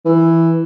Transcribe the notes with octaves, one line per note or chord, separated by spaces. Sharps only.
E3